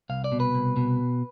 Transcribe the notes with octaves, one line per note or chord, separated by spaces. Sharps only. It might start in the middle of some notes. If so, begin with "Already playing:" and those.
C2 F5
D5
B2
B4
C2
B2